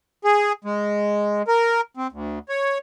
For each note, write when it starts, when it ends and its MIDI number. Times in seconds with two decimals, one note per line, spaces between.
0.25 0.52 68
0.64 1.42 56
1.48 1.81 70
1.97 2.07 60
2.12 2.39 38
2.49 2.78 73